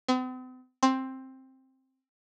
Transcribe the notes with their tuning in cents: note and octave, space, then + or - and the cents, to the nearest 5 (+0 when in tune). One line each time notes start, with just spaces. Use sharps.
C4 -45
C4 +10